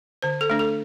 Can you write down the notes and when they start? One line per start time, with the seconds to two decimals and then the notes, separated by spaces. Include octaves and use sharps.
0.22 D3 C5
0.41 A4
0.50 A3 D4
0.59 A4